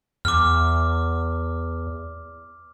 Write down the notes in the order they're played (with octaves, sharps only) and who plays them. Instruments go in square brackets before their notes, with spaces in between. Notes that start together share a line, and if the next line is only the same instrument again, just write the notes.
[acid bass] E2 [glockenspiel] D6 F6